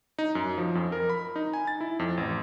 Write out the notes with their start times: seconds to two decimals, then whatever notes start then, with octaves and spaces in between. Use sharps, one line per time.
0.19 D#4
0.35 F#2
0.58 F3
0.75 F2
0.92 A#4
1.09 B5
1.36 D#4
1.54 G#5
1.67 A6
1.81 E4
1.99 F2
2.17 A1